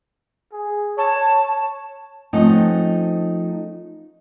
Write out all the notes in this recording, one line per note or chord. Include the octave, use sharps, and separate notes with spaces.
G#4
C#5 A5
F3 A3 C4 C#4 D#4 F#5